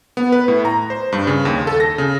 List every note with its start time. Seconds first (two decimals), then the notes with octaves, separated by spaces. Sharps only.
0.17 B3
0.32 B4
0.48 A2
0.65 A#5
0.90 C5
1.12 G2
1.27 C#3
1.45 D#2
1.67 A4
1.80 A#6
1.98 C#3